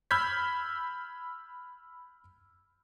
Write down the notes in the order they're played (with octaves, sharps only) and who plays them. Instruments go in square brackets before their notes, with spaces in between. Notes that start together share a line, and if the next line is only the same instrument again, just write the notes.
[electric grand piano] B5 E6 F6 G6 G#6 B6